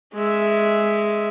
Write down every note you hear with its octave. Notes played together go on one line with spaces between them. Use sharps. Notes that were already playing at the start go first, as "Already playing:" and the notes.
G#3 E5